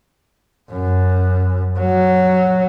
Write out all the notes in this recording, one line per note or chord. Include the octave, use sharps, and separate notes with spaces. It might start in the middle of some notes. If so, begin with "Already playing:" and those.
F#2
F#3